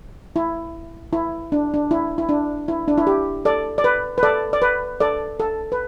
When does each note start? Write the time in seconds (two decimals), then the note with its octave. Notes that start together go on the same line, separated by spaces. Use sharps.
0.36 E4
1.13 E4
1.52 D4
1.74 D4
1.91 E4
2.18 E4
2.29 D4
2.68 E4
2.88 D4
2.98 E4
3.07 G4
3.45 A4 D5
3.78 D5
3.84 B4
4.18 B4
4.23 A4 D5
4.53 D5
4.62 B4
5.00 A4 D5
5.40 A4
5.72 B4